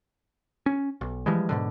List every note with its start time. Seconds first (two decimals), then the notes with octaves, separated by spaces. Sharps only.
0.66 C#4
1.01 B1
1.26 E3 F3 G3 G#3
1.49 G#2 B2 D3